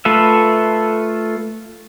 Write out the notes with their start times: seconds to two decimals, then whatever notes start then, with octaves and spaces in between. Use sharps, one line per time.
0.05 A3 F4 A4 B4 E5